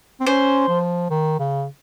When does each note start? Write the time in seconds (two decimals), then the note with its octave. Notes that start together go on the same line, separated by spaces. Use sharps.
0.20 C4
0.26 C#4 C5
0.69 F3
1.10 D#3
1.39 C#3